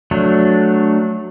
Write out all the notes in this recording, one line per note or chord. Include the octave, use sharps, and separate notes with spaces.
F#3 A3 D4